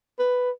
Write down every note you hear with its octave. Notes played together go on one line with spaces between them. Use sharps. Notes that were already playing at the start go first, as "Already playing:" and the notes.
B4